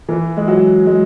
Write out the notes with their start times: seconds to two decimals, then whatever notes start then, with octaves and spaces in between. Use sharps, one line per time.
0.09 E3
0.37 G#3
0.48 F#3
0.86 G#3